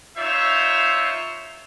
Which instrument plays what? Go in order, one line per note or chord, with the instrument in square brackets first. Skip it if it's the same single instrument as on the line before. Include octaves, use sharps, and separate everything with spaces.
[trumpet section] D#4 F4 C5 C#5 E5